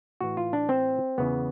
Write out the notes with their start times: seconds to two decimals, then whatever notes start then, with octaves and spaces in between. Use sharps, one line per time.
0.20 A2 E3 F#4
0.37 F4
0.53 D4
0.69 C4
1.18 E2 C#3 E3 B3